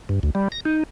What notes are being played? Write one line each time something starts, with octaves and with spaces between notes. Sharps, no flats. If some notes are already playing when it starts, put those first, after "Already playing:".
G2
D2
G3
A#6
D#4